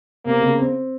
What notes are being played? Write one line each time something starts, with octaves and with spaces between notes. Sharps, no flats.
C3 A#3
C#3
C4